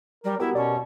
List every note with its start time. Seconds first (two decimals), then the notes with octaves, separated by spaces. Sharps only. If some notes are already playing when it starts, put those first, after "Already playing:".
0.24 G3 A#4
0.40 B3 E4 F#4 G4 A#4
0.55 B2 C#4 D5